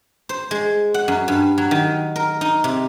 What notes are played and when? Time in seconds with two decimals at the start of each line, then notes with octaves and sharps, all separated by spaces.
0.29 C5
0.51 G#3
0.94 F#5
1.08 F#2
1.28 G2
1.58 F#3
1.71 D#3
2.16 A#4
2.41 D#4
2.64 C3